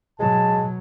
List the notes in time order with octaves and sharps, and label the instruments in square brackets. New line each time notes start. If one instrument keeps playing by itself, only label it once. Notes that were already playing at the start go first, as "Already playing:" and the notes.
[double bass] B2 F#3 [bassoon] G#3 [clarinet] A5